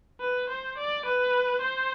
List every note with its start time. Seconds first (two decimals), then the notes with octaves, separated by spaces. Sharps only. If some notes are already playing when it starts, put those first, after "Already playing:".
0.20 B4
0.49 C5
0.78 D5
1.05 B4
1.61 C5